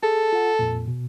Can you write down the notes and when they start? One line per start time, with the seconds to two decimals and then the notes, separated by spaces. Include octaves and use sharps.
0.03 G#4 A4
0.33 F4 F#5
0.59 F2 A#2
0.88 B2